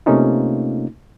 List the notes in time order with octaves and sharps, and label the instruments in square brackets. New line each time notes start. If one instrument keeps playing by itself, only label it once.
[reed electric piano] C3 A3 A#3 C#4 D#4 F4